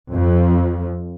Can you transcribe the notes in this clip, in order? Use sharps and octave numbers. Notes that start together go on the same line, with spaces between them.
F2